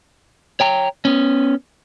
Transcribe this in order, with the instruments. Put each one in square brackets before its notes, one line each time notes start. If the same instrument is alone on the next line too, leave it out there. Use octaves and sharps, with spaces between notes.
[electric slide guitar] C#5 G5 A#5
B3 C#4